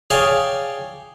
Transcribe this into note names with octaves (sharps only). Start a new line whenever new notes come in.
G#4 C#5 D5 F5 G5 A5